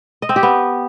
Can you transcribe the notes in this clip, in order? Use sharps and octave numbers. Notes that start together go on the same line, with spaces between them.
D#5
C4
G4
B3